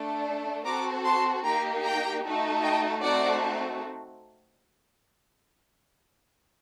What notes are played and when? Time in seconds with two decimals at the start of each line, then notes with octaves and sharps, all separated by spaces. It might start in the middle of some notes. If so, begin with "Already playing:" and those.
Already playing: A3 D4 A4
0.65 C4 F#4 A4 A#5 D6
1.04 A5 C6
1.44 A#3 D#4 G4 G5 A#5
1.83 G5 A#5
2.23 A3 D#4 F#4 A4
2.63 D#5 G5
3.02 A3 C4 D#4 F#4 A4 D5 F#5